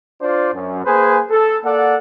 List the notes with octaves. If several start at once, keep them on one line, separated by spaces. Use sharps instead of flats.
D4 F4 C5 D5
F#2
A#3 G#4 B4 C5 G#5
A4
A#3 A4 D5 F#5